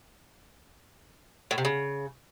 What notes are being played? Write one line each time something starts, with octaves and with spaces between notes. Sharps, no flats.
A2
C3
C#3